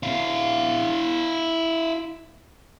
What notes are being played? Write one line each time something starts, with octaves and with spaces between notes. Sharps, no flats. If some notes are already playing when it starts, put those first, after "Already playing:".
E4 F5